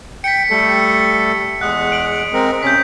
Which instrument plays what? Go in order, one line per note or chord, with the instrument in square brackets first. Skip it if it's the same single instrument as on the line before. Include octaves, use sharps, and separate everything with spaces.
[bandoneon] G5 [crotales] B6 C#7
[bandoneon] G3 A3 A4
[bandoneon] E2 G#3 F#5 [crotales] D#6 F#6
[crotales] D7 F#7
[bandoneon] G#3 C4 A#4
[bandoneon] C3 C#4 [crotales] G6 B6